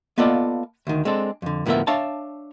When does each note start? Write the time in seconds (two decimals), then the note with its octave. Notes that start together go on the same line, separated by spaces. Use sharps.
0.18 A#3 B3 F4 A4 D5 D#5
0.87 D2 D#3
1.05 G#3 C4 D4 A4
1.42 F2 D3
1.66 D2 A2 F3 B3 A#4 E5
1.87 D4 C#5 E5 F5 A5